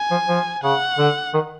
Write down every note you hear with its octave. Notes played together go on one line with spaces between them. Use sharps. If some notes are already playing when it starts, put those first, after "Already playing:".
Already playing: G#5
F3
F3
C#3 F#5
D3
D#3